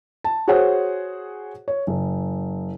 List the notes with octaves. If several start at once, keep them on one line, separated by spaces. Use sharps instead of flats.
A5
F#4 G#4 C5 C#5 F#5
C#5
F#1